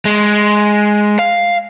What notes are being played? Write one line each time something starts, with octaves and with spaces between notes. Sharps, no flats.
G#3
F5